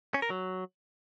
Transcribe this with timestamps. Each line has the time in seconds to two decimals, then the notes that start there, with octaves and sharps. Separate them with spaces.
0.14 C#4
0.22 A#4
0.30 F#3